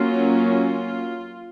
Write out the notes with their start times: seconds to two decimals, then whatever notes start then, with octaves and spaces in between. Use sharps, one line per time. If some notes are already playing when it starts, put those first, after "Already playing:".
Already playing: F#3 A#3 C#4 F4
0.51 F4